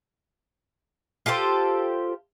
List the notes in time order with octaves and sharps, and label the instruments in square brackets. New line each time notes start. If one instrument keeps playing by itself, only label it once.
[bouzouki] F4 G4 A4 C5